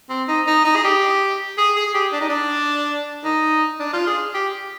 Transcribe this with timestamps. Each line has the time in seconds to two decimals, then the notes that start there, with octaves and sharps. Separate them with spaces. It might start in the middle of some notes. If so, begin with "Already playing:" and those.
0.09 C4
0.28 D#4
0.47 D#4
0.64 D#4
0.76 G#4
0.84 G4
1.58 G#4
1.76 G#4
1.94 G4
2.13 D4
2.21 D#4
2.29 D4
3.24 D#4
3.79 D4
3.93 F4
4.07 G#4
4.34 G4